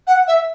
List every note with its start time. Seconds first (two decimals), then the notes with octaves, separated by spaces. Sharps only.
0.07 F#5
0.27 E5